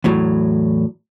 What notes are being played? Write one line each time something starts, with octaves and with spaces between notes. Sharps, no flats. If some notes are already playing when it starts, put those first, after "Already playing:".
E2 A2 F#3